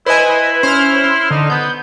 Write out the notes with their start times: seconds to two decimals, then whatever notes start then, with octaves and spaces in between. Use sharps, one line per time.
0.06 E4 B4 C5 D#5 G#5
0.28 E4
0.63 C#4 C5 F6
1.04 C6
1.30 D3 D#4
1.50 B3 G6